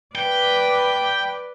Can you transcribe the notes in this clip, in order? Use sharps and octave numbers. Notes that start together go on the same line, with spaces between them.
B4 D5 G5